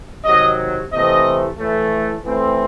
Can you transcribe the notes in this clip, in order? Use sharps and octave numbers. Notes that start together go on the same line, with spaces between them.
C3 D#3 F#3 D#5
C3 E3 A3 C4 D#5
A2 E3 A3
E3 A3 C4